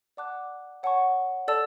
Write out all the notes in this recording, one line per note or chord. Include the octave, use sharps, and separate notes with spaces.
D5 F#5 A5 D6 F#6
C#5 F#5 A5 C#6
A4 D5 A5 E6